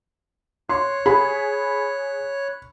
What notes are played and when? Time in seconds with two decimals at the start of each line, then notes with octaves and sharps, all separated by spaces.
0.69 C#5 C6 F#6
1.06 G#4 B5